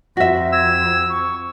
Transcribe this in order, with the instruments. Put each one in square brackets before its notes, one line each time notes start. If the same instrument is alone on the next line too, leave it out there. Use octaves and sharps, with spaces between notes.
[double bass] F2 [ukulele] F#4 E5 [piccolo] A#6
[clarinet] E6 [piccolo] G#6
[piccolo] C#6